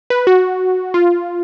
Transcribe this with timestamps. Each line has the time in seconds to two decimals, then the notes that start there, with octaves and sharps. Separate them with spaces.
0.10 B4
0.27 F#4
0.94 F4